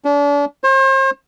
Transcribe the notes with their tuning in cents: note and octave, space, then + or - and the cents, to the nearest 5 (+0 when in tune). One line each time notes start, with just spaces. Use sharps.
D4 -35
C5 +40